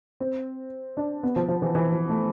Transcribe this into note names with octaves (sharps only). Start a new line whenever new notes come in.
C4
D4
B3
F3
F3
E3
E3
F3
A3